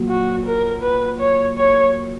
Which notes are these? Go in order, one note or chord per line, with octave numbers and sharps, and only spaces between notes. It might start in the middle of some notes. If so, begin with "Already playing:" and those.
Already playing: A#2 F#3
F#4
A#4
B4
C#5
C#5